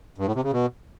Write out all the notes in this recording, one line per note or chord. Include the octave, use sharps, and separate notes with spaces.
G2
A2
C3
C#3
B2